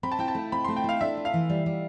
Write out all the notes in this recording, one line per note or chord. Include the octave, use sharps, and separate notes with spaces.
C4 B5
A5
E4 G5
A5
A3
C4 B5
C6
A3
G5
E4 F5
D4 E5
F4
F5
E3
G3
G3